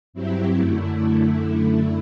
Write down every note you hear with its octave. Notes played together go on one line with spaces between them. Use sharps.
G2 F#3 C4 E4 G4
F#2 D3 A3 E4